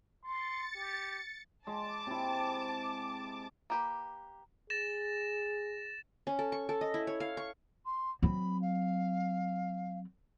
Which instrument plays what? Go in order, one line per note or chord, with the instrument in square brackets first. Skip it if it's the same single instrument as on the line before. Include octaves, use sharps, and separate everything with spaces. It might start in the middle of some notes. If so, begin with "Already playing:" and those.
[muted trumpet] C6 [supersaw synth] A6 C#7
[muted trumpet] G4
[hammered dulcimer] G#3 [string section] A5 D6
[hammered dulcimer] C3 E4
[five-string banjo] A#3 G4 B4
[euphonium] G#4 [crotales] A6 A#6 E7
[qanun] C#4
A4
C#6
A4
D#5
E4
C#5
F5
C#6
[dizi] C6
[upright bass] F#3 C4 [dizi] B5
[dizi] F5